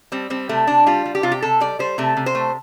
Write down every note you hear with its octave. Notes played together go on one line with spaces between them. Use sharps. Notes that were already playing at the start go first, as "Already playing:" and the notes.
G3 C4
G3 C4
C3 A3
C3 D4
G3 F4
G3
G4
C3 F4
G4
C3 A4
G3 D5
G3 C5
C3 A3
C3
C5
A3